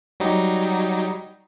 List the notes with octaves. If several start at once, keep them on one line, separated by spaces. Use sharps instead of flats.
F#3 G3 D#4